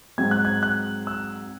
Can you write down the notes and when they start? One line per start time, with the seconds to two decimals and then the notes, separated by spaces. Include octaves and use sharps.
0.18 G#2 F#3 C4 G#6
0.31 F#6
0.45 G#6
0.63 F#6
1.07 E6